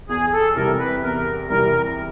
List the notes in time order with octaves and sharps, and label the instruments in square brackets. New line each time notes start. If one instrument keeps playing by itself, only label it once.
[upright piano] E2 [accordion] G#4
[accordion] A4
[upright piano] C3 E3 G3 [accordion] A#4
[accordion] B4
[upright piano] E2 [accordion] A#4
[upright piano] C3 E3 G3 [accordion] A#4